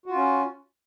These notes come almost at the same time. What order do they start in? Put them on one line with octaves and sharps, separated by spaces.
F#4 F4 C#4